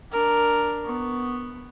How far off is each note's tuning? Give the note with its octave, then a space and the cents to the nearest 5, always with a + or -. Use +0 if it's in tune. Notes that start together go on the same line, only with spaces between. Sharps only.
D4 +0 A#4 +0
B3 +5 C#6 +0